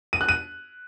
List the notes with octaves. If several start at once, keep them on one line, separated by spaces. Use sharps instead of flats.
D#7
F#6
D#7